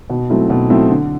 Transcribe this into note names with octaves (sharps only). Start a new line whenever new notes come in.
B2
F#3 A3 C4 E4
B2
F#3 A3 C4 E4
D3